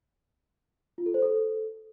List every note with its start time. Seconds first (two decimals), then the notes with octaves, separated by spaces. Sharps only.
0.98 F4
1.06 A4
1.14 C5
1.22 A4